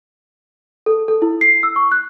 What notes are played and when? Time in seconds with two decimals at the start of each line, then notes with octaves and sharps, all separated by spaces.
0.86 A4
1.08 A4
1.22 E4
1.41 C7
1.63 E6
1.76 C#6
1.92 F#6